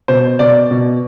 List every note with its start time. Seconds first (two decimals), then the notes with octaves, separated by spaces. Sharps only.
0.08 B2 C5
0.39 B2 D5
0.71 B2